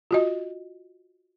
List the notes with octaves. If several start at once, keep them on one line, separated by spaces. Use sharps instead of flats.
F4 F#4 D#5